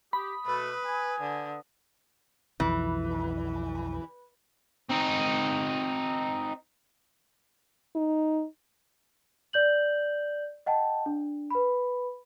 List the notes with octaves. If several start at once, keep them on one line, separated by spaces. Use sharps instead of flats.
G4 B5 D#6
B2 A3 B4
G#5
D3
B1 F2 E3
C4 D#4
D#4
D5 G6 F#7
D#5 F#5 G5 A5
D4
B4 B5